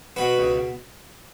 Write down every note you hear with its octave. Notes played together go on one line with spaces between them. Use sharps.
B2 F#4 B4
C#2